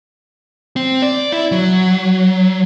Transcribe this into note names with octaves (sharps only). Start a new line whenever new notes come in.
C4
D5
E4
F#3